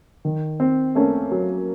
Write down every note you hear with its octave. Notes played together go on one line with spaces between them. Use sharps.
D#3
C4
A3 A#3 C#4
F#3